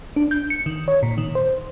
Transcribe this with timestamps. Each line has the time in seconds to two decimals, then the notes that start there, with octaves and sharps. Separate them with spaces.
0.16 D4
0.31 G6
0.50 C#7
0.66 D#3
0.88 C#5
1.03 A#2
1.18 D#3
1.35 C5